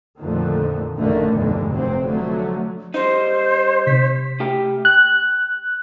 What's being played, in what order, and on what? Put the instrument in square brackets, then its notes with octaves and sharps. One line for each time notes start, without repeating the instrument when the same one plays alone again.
[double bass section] F2 A#2 D3 D#3 F3 A3
A1 F#2 D3 D#3 A3 A#3
F1 B1 E2 G2 D3 G#3
F1 C3 F#3 C4
D3 F3 F#3 A3
[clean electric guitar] G3 D#4 [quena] C5
[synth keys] C3 B6
[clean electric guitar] A3 G4 G5
[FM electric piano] F#6